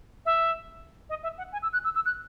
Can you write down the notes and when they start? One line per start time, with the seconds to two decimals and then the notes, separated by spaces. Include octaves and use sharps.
0.26 E5
1.10 D#5
1.23 E5
1.38 F#5
1.53 G#5
1.63 E6
1.73 F#6
1.84 E6
1.95 E6
2.06 F#6